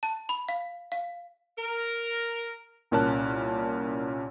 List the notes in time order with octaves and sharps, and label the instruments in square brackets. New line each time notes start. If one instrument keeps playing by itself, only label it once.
[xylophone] A5
B5
F5
F5
[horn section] A#4
[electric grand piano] C2 A#2 C#4 A#4 A5 F#6